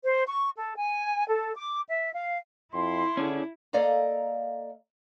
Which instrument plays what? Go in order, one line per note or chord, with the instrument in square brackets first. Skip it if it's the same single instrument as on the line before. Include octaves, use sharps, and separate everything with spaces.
[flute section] C5
C#6
A4
G#5
A4
D6
E5
F5
[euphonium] F2 [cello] E4 [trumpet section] C6
[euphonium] D3 [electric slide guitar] C#4 D4 G#4
[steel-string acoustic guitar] A#3 A4 D5 D#5 F5 A#5